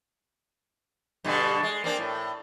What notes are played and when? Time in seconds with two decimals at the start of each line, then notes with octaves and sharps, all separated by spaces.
1.24 G2 B2 D3
1.63 G#3
1.84 A#3 C4 D4
1.98 A2